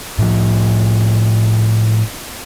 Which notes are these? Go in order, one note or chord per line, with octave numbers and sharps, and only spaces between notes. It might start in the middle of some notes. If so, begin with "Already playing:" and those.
A2 F3